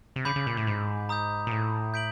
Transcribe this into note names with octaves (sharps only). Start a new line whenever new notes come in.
C3
C#3 B5 D6 G6 B6
C#3
A#2
A2
G#2
A#5 D#6 G6
A#2
A2
G6 B6 D7 F#7